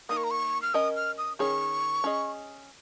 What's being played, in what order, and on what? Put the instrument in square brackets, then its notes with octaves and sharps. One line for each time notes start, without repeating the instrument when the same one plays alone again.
[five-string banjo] A#3 D#4 A#4 [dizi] D#6
[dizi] C#6
A#5
C#6
F6
[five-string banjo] C#4 A#4 D#5 [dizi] D#6
[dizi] F6
D#6
[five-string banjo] D#3 C#4 G#4 C#5 [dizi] C#6
[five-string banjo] C#4 G#4 D#5